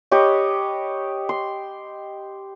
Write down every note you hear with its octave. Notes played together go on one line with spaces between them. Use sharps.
G4 B4 C#5 D#5
C6